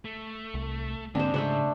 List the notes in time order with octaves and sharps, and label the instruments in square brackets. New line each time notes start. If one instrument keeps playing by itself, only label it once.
[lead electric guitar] A3
[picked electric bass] C2
[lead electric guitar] G#2 [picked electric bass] D3 A#3 C4 [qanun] D4 C5
[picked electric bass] C#3 [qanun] A3 D4 C5